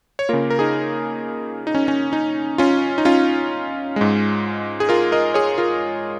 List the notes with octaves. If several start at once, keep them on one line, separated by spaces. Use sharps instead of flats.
C#5
C#3 A#3 F4 A#4
A#4
D#4 G#4
D#4
C#4
C#4
D#4
C#4 F4
D#4
C#4 F4
G#2 G#3
G#4
F4 A#4
A#4 D#5
G#4 C#5
F4 A#4